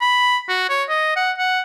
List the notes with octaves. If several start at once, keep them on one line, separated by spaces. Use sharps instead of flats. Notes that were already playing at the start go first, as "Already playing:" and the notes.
B5
F#4
C#5
D#5
F#5
F#5